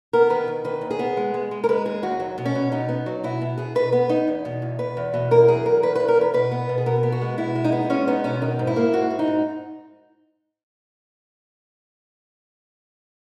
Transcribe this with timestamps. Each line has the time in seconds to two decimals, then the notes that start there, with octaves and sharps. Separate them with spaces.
0.13 B3 A#4
0.30 D#3 B4
0.48 D#3
0.64 D#3 B4
0.81 D#2
0.91 G#4
0.99 B3
1.17 G#3
1.34 G#3
1.51 G#3
1.64 A#4
1.69 G#3 B4
1.85 D#2 G#4
2.03 D#2 F#4
2.20 F#3
2.38 B2
2.45 C#4
2.55 B2
2.72 B2 D#4
2.89 B3
3.06 F#3
3.24 B2 E4
3.41 B2
3.58 B2 G#4
3.75 B2 B4
3.92 B3 B4
4.09 B3 D#4
4.28 E2
4.45 B2
4.62 E2
4.79 B2 B4
4.97 E2
5.14 B2
5.31 E2 A#4
5.48 F#3 G#4
5.65 E2 A#4
5.83 E2 B4
5.96 E2 B4
6.08 A#4
6.17 E2 B4
6.34 B2 B4
6.52 B3
6.69 B2
6.78 G#4
6.86 B2 A#4
7.03 B3
7.12 F#4
7.21 G#3
7.37 B2 E4
7.55 G#3
7.64 D#4
7.72 B3
7.90 G#3 C#4
8.07 B3 D#4
8.24 B2 C#4
8.42 D#3 D#4
8.59 G#2
8.67 E4
8.76 A#3
8.93 G#2 F#4
9.10 G#2
9.19 D#4
9.27 G#2